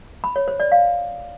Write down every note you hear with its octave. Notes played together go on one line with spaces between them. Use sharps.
B5
C#5
C5
D5
F5